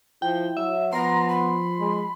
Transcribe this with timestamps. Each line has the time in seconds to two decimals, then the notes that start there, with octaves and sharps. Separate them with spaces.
0.22 F3 E4 G5
0.57 F#3 E5
0.93 F3 B3 A#5 C6
1.29 B5
1.79 G#3